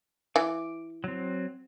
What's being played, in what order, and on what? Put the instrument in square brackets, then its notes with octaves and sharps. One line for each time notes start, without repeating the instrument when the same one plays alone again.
[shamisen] E3 [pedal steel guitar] D6
[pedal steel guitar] F#3 C4